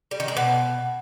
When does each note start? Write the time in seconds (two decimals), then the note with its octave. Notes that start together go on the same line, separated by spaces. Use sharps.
0.11 G3
0.20 D#3
0.28 G#3
0.37 B2